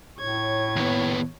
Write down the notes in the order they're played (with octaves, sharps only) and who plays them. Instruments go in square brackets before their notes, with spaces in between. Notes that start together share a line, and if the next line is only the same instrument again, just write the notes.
[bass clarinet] A2 [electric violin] C#5 G#6
[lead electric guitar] D#2 B3